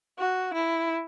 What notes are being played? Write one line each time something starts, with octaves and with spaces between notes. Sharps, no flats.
F#4
E4